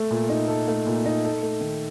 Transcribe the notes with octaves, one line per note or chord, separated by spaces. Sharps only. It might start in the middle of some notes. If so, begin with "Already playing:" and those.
Already playing: A3 A4
A#2
D#4
A4
A3
A#2
D#4
A4
A3
D#3